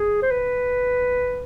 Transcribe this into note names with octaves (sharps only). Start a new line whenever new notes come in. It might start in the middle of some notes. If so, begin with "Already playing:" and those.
Already playing: G#4
C5
B4